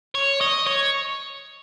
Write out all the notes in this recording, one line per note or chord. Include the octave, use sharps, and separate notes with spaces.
C#5
D#5
C#5